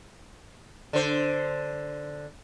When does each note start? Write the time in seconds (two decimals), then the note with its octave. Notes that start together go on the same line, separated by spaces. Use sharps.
0.93 D3 C5